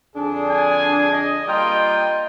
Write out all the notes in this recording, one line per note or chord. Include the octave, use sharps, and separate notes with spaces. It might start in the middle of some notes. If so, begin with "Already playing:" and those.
F2 D3 D4 G#4
G#5
D#5
G3 A#3 F4 A#4 D#5 G5 C6